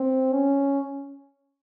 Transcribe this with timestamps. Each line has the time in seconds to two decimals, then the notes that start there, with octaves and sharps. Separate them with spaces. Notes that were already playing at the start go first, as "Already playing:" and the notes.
Already playing: C4
0.33 C#4